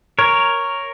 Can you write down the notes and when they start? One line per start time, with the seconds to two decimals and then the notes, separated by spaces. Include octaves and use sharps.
0.19 A#4 C#5